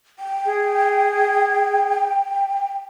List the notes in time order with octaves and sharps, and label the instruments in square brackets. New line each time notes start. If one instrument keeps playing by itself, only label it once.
[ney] G5
[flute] G#4